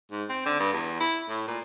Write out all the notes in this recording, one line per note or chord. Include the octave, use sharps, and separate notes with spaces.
G#2
C4
D3
G2
E2
E4
A2
A#2